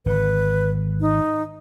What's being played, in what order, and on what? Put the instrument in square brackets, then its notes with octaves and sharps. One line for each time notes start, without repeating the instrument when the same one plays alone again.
[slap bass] G#1 D3 [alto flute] B4
[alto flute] D#4